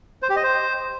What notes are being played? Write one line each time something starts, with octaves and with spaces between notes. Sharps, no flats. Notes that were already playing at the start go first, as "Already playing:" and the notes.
C5
G4
D#5
C5